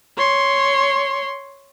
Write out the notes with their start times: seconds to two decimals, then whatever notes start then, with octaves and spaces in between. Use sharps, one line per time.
0.17 C#5 C6